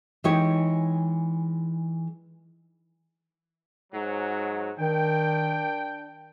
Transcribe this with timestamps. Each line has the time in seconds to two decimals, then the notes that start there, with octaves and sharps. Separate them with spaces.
0.24 E3 G#3 D#4 G4 C#5
3.93 G#2 F#3
4.80 D#3 D4 G5